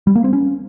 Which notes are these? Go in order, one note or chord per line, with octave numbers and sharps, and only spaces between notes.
G3
A#3
C4
C#4